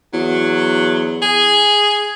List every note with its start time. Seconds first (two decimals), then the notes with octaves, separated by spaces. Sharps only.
0.13 E2 F#3
1.22 G#4